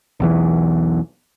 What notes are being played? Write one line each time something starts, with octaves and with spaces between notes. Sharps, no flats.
B1 E2 E3